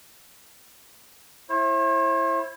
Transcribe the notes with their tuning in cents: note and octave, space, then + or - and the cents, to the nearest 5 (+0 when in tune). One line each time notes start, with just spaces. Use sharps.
E4 +5 C5 +45